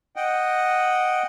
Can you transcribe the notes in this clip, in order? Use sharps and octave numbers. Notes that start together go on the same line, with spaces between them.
D#5 F#5 G5